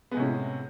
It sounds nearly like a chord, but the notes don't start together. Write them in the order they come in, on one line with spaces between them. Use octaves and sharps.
B3 G#3 C3 C#4 A2